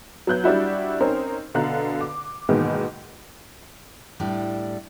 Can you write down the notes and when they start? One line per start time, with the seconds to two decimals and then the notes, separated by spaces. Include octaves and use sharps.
0.27 F#3 B3 F#6 G6
0.44 G3 D4 E4 F#4
1.01 C4 C#4 D#4 A#4 C5
1.54 B2 D3 F5 A#5 F#6
2.01 D6
2.49 G#2 B2 D#3 E3 G#3 A#3
4.20 A2 G3 D4